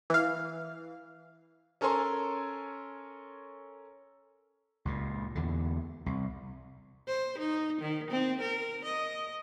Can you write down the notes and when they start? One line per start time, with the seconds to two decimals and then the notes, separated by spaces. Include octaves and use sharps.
0.10 E3 F5
1.81 C#4 A4 A#4 C#5 G#5 C6
4.85 C#2 A#2
5.35 E2 D3
6.06 C2
7.08 C5
7.38 D#4
7.81 D#3
8.11 C4
8.41 A#4
8.85 D#5